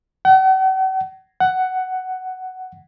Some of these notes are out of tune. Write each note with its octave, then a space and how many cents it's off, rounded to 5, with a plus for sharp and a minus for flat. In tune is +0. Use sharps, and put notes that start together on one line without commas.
F#5 +45
F#5 +10